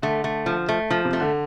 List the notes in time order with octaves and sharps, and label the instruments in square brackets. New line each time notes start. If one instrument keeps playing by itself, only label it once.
[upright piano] D3 [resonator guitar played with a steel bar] A3
[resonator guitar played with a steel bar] A3
F3
A3
F3
[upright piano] C3
[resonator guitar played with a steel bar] A3
[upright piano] D3